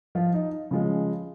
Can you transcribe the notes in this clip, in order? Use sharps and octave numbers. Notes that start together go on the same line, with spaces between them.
F3 F4
D#4
C#3 F3 G#3